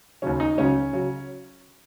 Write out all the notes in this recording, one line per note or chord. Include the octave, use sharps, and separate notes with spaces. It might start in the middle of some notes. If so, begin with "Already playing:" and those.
D#2 C#3 F#3 C#4
D#4
C#2 C#3 F#3 C#4
C#3 F#3